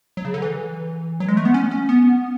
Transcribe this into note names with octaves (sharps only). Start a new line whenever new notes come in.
F#3
C#3
D3
E3
F#3
G#3
A3
B3
C#4
C#4
B3